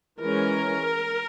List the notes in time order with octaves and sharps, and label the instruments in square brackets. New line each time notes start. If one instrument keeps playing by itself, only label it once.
[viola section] E3 G#3 C#4 A#4